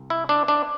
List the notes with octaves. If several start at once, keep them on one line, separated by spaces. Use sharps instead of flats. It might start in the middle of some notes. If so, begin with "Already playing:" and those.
Already playing: C2
E4
D4
D4